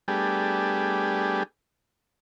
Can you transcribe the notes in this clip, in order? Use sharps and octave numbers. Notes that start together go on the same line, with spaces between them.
G3 A3 B3 D4 G4 G#4